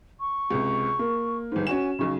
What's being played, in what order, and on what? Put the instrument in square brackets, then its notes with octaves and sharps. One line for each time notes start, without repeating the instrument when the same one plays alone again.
[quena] C#6
[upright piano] C#2 C3
A#3
[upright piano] G1 G#2 [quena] C5
[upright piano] C#4 F#4 E7 [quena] G#5
[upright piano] B1 C#3 [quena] C#6